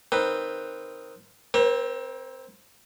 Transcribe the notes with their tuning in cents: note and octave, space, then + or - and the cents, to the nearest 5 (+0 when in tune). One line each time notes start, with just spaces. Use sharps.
D#3 +0 C4 +0 B4 +0
C4 +0 A#4 +40 C#5 -45